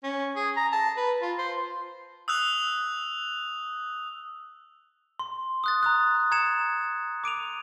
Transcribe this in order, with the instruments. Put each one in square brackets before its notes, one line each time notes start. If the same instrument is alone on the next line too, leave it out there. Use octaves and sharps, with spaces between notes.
[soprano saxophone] C#4
G#4
A#5
A5
B4
F4
C5
[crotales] D#6 E6 F#6 F7
[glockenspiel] C6
D#6 F#6 A6
A#5 D#6 F#6
A#5 G#6 C#7 E7
D6 D7 D#7 F7